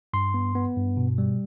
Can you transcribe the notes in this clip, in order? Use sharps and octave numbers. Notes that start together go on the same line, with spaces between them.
G2 C6
B3
B3
G2
B2
G3